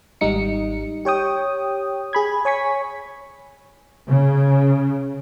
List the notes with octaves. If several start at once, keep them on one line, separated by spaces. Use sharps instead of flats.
G#1 G#2 G3 D#4 C#7
G4 C#5 G5 D#6
G#4 B5 G#6
C#5 G#5 C#6 B6
C#3